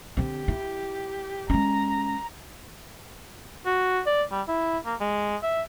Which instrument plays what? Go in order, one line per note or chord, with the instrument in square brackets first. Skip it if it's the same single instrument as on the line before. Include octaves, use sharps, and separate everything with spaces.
[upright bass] D3 C4 [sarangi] G4
[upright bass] E4
[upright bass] G#3 C#4 [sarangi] A#5
[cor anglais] F#4
D5
G3
E4
A#3
G#3
E5